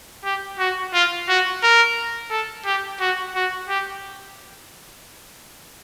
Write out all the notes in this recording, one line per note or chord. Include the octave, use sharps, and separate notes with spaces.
G4
F#4
F4
F#4
A#4
A4
G4
F#4
F#4
G4